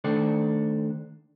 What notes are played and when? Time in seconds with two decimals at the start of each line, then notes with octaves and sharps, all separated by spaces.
0.04 D#3 A3 D4 A4 C5 D5